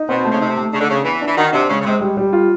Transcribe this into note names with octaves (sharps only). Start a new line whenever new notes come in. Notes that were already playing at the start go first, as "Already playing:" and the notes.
Already playing: D#4
B2 C4
A3
C#3
C3 D#4
A3
C#3 D4
D3
C#3 D4
E3 B3
D4
E3
D#3 F#4
C3 D4
C#3 G#3
C#3
C3 G#3
G3
G3
F4